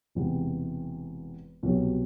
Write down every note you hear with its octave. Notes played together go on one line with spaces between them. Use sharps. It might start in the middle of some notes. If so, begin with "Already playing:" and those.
E1 E2 C3 G3
C2 B2 F#3